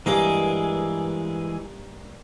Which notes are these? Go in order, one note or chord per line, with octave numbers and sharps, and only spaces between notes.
G2 E3 G#3 A#3 G#4 D6